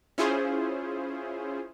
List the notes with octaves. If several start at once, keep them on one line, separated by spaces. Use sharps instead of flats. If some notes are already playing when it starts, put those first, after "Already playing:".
C#4 E4 F4 G#4 C5